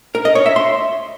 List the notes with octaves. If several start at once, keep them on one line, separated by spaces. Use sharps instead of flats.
A#4
D#5
C#5
E5
C6